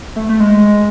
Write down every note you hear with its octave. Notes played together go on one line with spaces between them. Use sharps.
A3
A3
G#3